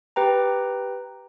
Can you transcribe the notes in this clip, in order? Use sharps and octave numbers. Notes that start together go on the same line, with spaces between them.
G4 B4 G5 A#5